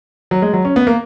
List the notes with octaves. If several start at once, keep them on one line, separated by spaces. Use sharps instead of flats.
F#3
G#3
F#3
C#4
B3
A#3